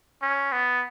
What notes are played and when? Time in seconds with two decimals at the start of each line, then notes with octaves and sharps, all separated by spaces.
0.22 C#4
0.52 B3